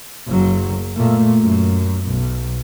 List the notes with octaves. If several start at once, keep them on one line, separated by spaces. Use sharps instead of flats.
F#1 F#3
A#2 A3
F#2
B1